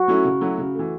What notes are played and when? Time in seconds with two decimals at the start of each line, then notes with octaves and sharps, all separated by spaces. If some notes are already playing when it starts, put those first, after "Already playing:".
Already playing: F#4
0.08 F#3 A3 C#4 E4
0.25 C#3
0.41 F#3 A3 C#4 E4
0.58 C#3
0.75 E3 A3